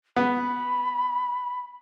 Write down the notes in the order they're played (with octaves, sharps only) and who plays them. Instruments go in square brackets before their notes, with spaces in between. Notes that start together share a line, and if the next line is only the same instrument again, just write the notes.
[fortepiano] B3 [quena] B5